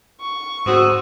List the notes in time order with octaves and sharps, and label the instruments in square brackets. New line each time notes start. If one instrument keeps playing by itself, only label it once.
[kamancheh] C#6
[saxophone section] D2 C4 F#4 [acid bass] G#2 [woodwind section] D#6 E6